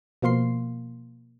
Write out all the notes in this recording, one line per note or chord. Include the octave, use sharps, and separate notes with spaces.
B2 F3 A#3 F5 C6 C7